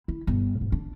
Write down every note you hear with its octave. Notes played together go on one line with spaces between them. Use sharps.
E4
G1
G#2
D4